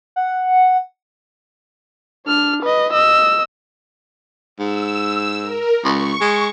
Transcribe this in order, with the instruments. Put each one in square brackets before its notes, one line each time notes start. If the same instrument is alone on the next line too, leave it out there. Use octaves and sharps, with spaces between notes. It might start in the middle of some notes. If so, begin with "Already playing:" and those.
[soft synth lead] F#5
[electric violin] D4 F6
B4 D#5
D#5 E6
[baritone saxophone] G#2 [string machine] E6
[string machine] A#4
[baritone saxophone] C#2 [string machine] C#6
[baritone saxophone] G#3